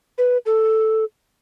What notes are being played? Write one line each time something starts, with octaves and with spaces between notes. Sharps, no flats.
B4
A4